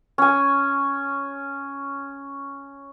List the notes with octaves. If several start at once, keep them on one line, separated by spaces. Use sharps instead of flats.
C#4 G#5